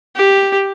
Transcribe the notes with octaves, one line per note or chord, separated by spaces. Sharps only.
G4